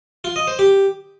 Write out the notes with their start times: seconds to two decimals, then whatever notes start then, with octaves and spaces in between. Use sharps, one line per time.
0.24 F4
0.36 D#5
0.47 C5
0.59 G4